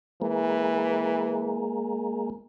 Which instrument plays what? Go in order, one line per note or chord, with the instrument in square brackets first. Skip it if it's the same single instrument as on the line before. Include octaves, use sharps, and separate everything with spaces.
[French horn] E3 [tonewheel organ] G#3 A#3